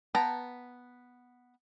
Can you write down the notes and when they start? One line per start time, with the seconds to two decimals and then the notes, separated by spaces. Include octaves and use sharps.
0.15 B3 G5 A5 A#5